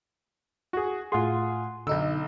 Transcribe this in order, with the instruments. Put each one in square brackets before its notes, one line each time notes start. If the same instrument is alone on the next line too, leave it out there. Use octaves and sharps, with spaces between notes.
[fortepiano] F#4 G#4
[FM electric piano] A2 F#5 C6 [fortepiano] F4 G#4
[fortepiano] B1 E6 [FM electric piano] D3 D#4